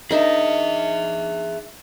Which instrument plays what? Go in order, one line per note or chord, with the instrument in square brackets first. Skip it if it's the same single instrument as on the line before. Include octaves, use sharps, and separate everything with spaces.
[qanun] D4 D#4 A#4 [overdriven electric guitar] G#4 E5